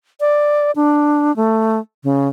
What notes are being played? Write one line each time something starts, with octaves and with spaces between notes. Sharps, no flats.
D5
D4
A3
C#3